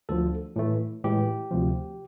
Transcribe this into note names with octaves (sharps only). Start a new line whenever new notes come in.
D2 D3 F3 A4
A2 E3 A3
A2 E3 G#3 G4
D2 C3 F3